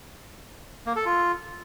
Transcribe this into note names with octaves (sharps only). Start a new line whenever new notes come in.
A#3
A4
F4